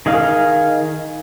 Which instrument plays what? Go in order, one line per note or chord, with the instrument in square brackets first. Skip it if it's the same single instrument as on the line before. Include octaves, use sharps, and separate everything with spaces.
[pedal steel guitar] D#3 G#4 D#5 F5 F6